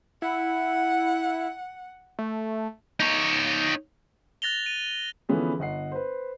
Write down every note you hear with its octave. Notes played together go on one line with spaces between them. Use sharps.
E4 F#5
A3
D#4 C#5
F#6 A6 A#6 F7 G7
D#7
D3 E3 F3 B3 C#4 G#4
G1 D#5 F#5 C7
B4 C5